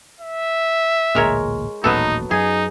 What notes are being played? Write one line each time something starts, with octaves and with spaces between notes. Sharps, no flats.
E5
A1 D2 A#2 G#3 A#4 C#5
D#1 A1 A#2 F#3 B3 D#4 A4
F#2 F#3 D#4 G#4